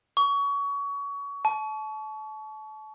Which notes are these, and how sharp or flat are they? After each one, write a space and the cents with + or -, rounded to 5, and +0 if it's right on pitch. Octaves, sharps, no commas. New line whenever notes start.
C#6 +25
A5 -30